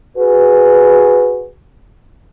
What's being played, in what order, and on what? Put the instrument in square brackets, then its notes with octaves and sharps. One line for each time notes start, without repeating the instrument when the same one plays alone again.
[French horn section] F#4 G#4 B4